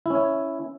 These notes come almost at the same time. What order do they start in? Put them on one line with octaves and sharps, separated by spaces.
E4 C#4 C#5